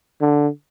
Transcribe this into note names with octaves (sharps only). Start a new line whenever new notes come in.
D3